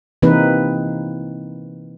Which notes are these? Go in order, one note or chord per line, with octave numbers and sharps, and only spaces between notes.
C3 E3 A#3 C4 D#4 B4